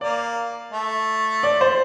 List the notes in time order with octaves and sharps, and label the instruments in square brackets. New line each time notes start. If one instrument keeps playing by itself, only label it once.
[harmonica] A#3 [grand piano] D5
[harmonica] A3
[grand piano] D5
C5